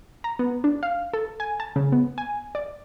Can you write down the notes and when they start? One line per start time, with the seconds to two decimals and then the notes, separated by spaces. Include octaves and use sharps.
0.24 A#5
0.39 B3
0.64 D4
0.83 F5
1.14 A4
1.40 G#5
1.60 A5
1.76 C#3
1.92 B3
2.18 G#5
2.55 D5